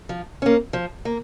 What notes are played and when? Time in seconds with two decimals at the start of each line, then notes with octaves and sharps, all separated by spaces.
0.09 F3
0.42 A#3 C#4
0.73 F3
1.05 A#3